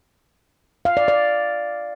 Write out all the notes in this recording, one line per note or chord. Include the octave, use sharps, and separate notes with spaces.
F5
D5
D5